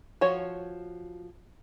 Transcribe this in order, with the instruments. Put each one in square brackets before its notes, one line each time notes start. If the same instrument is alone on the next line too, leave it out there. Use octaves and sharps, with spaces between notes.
[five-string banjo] F3 F#4 C#5